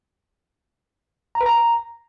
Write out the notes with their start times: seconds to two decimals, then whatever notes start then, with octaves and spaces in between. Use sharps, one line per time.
1.35 A#5
1.41 B4
1.46 A#5